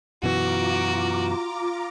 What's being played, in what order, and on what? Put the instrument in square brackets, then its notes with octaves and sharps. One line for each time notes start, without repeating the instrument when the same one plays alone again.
[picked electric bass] F#2 B2 E3 [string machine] F4 A#5 D6 [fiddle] F#4